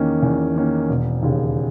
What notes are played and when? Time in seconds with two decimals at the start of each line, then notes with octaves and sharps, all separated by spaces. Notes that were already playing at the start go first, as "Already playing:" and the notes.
Already playing: E2 D#3 A#3 C#4
0.22 E2
0.56 D#3 A#3 C#4
0.89 E1
1.23 D#2 C#3